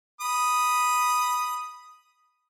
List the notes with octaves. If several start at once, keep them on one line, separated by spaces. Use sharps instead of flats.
B5 D#6